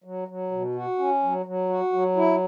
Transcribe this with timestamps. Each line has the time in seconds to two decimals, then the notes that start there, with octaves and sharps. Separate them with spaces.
0.04 F#3
0.28 F#3
0.51 B2
0.75 F#4
0.99 C#4
1.23 F#3
1.46 F#3
1.69 F#4
1.93 F#3
2.16 E4